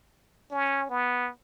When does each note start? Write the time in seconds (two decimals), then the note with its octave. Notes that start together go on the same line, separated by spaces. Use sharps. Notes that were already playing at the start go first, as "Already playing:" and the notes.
0.51 C#4
0.90 B3